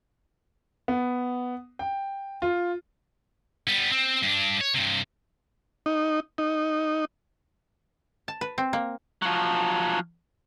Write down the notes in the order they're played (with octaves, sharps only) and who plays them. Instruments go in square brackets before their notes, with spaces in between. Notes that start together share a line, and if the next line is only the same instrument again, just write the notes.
[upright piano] B3
G5
F4
[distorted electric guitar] G3 B3
C4
G2 D4
C#5
G2 C3
[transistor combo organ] D#4
D#4
[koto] A5
B4
C4
A#3
[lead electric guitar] F3 F#3